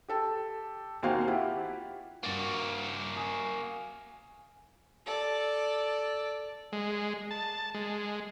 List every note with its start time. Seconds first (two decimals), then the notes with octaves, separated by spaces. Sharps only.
0.08 G4 A4 A5
1.03 D#2 A#3 C4 F#4 F5 G#5
1.27 E4 F4 G4 F#5
2.23 G2 A#3 F#4 A6
3.16 G#5 D#6
5.06 A4 D5
6.73 G#3
7.31 A5
7.74 G#3